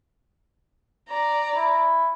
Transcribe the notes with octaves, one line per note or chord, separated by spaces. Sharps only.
D5 A#5
E4